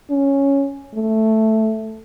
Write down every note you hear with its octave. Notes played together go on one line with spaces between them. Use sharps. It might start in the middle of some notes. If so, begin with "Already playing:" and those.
C#4
A3